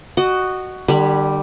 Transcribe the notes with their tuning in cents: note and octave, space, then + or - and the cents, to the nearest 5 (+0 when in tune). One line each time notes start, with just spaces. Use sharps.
F#4 +10 D#5 -25
D3 +40 G3 +0 B5 +0